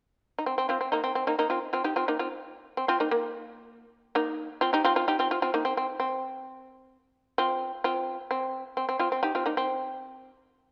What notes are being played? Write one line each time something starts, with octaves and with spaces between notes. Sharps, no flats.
D#4
C4
C4
C4 F4
C4
A#3 D#4
C4
C4
A#3 D#4
A#3 D#4
C4 F4
C4 F4
D#4 G4
C4 F4
A#3 D#4
C4 F4
C4
C4 F4
A#3 D#4
A#3
A#3 D#4
C4 F4
D#4 G4
C4 F4
C4 F4
D#4 G4
C4 F4
C4 F4
C4 F4
A#3 D#4
C4
C4
C4
C4 F4
C4 F4
C4
C4
C4
C4 F4
C4
D#4 G4
C4 F4
A#3 D#4
C4